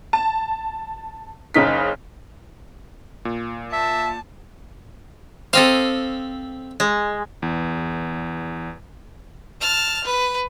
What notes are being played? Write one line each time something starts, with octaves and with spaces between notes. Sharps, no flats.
A5
F#1 C#3 D#4 B6
A#2
E5 A5
C4 G4 A4 C5 D#5 F5
G#3
E2
A5 F6
B4